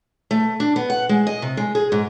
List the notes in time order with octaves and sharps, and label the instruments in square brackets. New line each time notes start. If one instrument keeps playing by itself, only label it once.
[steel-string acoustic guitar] A3
D4
B3
F#5
G#3
D#5
C3
G#3
G#4
G#2